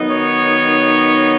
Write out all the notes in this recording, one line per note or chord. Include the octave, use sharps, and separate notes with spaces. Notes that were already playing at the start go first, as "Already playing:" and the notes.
Already playing: D#3 F#3 B3 D#4
C#5